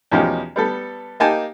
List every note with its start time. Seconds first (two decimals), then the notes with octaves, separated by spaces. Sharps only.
0.11 E2 B2 F3 C#4 D#4 G4
0.56 G3 B3 A4
1.20 A#3 D#4 G4 G#5 A5